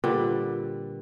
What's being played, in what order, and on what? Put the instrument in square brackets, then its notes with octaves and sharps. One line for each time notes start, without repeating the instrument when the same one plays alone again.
[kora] A#2 D3 G3 B4